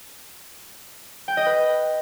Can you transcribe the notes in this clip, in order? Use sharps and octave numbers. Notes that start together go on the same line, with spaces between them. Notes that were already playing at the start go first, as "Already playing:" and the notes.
G5
D#5
B4